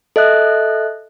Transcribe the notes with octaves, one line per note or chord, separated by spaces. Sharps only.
A4 D#5 E5 F#6